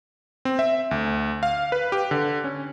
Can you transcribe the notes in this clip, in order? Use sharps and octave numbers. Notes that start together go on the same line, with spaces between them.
C4
E5
D2
F5
B4
G4
D3
C#4